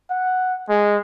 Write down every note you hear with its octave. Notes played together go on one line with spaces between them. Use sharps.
F#5
G#3